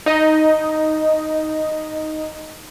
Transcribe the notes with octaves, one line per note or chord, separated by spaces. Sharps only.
D#4 D#5